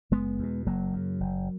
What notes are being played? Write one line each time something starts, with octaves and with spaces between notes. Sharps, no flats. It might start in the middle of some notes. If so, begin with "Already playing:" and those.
F#1 G#3 B3
E2 B2
F#1 F#3 A#3
F#2 C#3
F#1